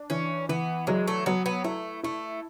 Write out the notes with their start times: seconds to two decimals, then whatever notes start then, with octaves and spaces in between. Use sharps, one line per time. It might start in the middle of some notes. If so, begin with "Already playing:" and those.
Already playing: D4
0.10 E3 C#4
0.49 E3 B3
0.87 F#3 G#3
1.08 A3
1.26 F#3 B3
1.46 B3
1.64 A3 E4
2.03 A3 E4